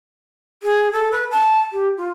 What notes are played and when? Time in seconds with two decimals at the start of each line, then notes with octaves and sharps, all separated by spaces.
0.63 G#4
0.92 A4
1.12 B4
1.31 A5
1.72 G4
1.97 F4